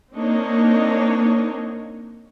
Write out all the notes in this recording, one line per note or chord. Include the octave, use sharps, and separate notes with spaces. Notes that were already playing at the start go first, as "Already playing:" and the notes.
A#3 C4 D4 D#4 C#5 D#5